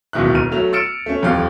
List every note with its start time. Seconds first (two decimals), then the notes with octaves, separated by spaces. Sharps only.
0.13 D1 C#2 B2 D#3 E5 F#6
0.34 E1 F6 D#7
0.51 F#3 A3 F7
0.73 E6 F6 A6 C#7 D7 E7
1.06 A3 C#4
1.22 D#1 F2 G4 F5 F#6